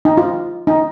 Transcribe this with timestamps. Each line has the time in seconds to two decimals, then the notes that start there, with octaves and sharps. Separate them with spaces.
0.05 D#4
0.17 F4
0.67 D#4